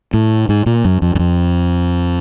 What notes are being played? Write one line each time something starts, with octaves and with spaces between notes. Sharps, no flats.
A2
G#2
A#2
F#2
F2
F#2
F2